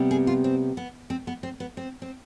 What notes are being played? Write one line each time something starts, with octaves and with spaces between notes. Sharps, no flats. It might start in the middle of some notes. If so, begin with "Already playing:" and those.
Already playing: C3 G3 B3
G#4
F4
C4
B3
C4
B3
C4
B3
C4
C4